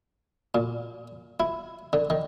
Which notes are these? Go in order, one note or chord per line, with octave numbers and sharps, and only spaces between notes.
A#2
E4
D3
D#3